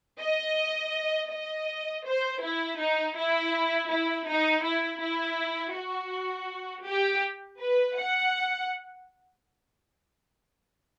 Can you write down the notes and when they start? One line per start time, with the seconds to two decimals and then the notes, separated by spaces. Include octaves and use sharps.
0.20 D#5
1.31 D#5
2.05 C5
2.42 E4
2.80 D#4
3.16 E4
3.90 E4
4.27 D#4
4.64 E4
5.00 E4
5.75 F#4
6.86 G4
7.60 B4
7.97 F#5